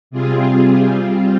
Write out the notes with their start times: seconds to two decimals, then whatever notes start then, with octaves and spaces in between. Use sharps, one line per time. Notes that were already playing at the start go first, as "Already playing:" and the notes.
0.11 C3 G3 C4 F4 G#4
0.92 G3 C4 F4